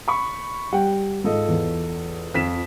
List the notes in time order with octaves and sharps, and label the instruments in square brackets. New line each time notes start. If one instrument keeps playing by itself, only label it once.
[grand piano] B5 C#6
[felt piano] G3 [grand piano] F#5 G5
[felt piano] G#2 [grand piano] F4 A4 D#5
[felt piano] E2
[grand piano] F2 B6 E7 [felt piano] F3